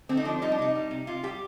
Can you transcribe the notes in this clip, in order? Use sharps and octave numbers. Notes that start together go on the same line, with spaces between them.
D3 C4
D#4
F3 D4
G3 D#4
D4
C3 D#4
G3
C3
C3 F4
G3 G4